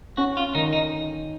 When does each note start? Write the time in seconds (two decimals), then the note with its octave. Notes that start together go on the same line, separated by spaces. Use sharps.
0.17 C#4 F#4
0.37 F4
0.55 D#3 D#4
0.73 D#4